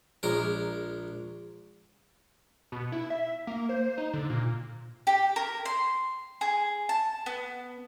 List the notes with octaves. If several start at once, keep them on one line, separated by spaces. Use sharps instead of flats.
A#1 G#3 A#4
B2
E4
E5
A#3
C5
D#4
D3
A#2
G4
A#4
C6
G#4
A5
B3